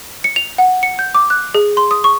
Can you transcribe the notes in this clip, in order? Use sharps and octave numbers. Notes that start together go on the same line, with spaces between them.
C#7
F7
F#5
C#7
G6
D6
F#6
G#4
C6
D#6
C#6